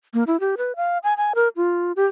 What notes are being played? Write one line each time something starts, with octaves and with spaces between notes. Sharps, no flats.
A#3
E4
G4
B4
F5
G#5
G#5
A#4
F4
G4